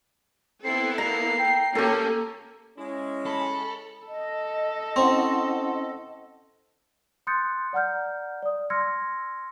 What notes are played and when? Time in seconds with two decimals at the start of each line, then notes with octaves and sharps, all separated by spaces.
0.64 B3 C4 E4 A4 C7
0.98 A#3 A#5 C7
1.38 G5
1.75 A#3 C#4 G4 A4 A#4
2.78 G#3 C#4 E4
3.26 A4 B5
4.08 A4 D#5
4.96 C4 C#4 E4 F#5
7.27 C6 D#6 F#6 G6 A6 C#7
7.73 D5 F#5 A#5 F6 G6
8.43 D5 D#6
8.70 C6 E6 F6 G#6 A#6 C#7